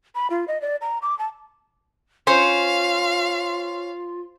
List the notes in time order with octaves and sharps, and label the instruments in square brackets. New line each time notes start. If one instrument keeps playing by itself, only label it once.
[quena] B5
F4
D#5
D5
A#5
D6
A5
[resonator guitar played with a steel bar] C#4 [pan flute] F4 [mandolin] C5 [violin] F5